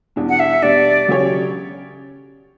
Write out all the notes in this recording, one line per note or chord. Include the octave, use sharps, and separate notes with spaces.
E2 B2 G3 D4 G4
F#5
E5
B2 G3 D4 D5
C#3 F#3 C#4 G4 C#5